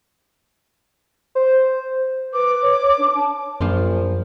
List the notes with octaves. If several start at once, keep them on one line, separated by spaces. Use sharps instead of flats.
C5
B4 D6
C#5
C#5
D4
A5
A#1 F#2 F3 F4